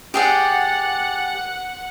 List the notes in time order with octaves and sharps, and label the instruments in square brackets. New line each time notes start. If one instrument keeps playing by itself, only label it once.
[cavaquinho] G4 G#4 D5 [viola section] F#5